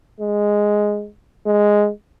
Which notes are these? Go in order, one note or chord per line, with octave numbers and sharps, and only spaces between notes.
G#3
G#3